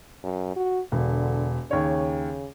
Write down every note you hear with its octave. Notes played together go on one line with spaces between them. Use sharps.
F#2
F#4
E1 D3
D#2 C#3 C#5